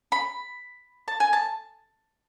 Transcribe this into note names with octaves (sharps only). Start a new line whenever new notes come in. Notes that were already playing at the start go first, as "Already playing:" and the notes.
B5
A5
G#5
A5